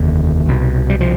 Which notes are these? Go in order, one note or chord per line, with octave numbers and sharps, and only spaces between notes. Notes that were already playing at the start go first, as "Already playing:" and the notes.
Already playing: F1 D#2 D3
C2 B2
G3
F3